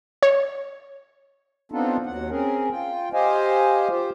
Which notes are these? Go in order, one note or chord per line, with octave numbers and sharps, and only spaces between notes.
C#5
B3 C4 D4 D#4 F4 A4
D#2 F#3 F#5
C4 C#4 G#4 A#4
F4 G5
G4 C5 D#5 F5 G#5
F4 G4 C5